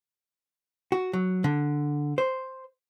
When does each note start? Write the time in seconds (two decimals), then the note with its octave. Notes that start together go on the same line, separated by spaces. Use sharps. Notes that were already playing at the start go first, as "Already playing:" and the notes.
0.92 F#4
1.13 F#3
1.44 D3
2.18 C5